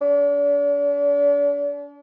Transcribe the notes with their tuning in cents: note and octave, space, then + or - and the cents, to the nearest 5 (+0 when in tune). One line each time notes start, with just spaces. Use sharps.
D4 -40